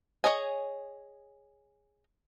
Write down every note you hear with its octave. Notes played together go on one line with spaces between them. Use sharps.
G#4 A4 C#5 D#5 G#5